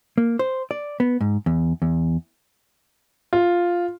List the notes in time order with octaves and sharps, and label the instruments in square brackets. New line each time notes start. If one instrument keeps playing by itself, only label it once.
[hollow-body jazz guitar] A#3
C5
D5
B3
G#2
E2
E2
[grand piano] F4